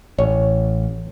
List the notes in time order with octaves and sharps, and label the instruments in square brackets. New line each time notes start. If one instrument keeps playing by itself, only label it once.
[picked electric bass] A1 [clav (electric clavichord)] C#5